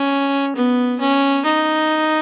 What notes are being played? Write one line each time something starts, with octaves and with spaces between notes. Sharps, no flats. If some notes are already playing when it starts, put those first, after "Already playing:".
Already playing: C#4
B3
C#4
D#4